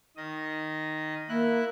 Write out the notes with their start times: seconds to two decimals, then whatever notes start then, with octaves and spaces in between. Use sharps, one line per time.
0.17 D#3 D#5
1.29 A#3 E4 F#6